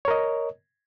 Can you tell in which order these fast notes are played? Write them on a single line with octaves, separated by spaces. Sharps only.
C#5 A#4 D#5